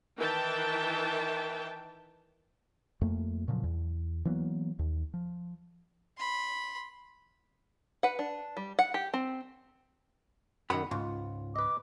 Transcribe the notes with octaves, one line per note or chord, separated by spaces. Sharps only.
D#3 E3 E5 G5 A5
F2 A3 A#3
A#2 C#3 F3 F#3
E2
E3 F#3 A#3 B3
D#2
F3
B5 C6
B4 F#5
D4
G3
F#5
G4
C4
F#2 D#3 F#5 B5
C#2 G#2 F4
B4 D#5 D6